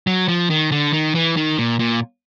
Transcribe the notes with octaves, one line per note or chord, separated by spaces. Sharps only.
F#3
F3
D#3
D3
D#3
E3
D#3
A#2
A#2